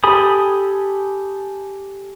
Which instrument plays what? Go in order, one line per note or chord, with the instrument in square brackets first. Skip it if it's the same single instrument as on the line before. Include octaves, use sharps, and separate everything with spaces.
[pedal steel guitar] G4 A4 G#5 B5 D#6